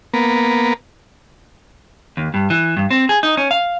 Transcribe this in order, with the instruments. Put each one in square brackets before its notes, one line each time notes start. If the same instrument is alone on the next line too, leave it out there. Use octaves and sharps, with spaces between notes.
[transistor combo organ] A#3 B3
[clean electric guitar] D#2
G2
E3
G2
C4
G#4
D#4
C#4
F5